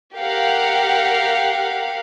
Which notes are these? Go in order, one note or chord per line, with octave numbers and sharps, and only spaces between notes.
G4 A#4 F5 F#5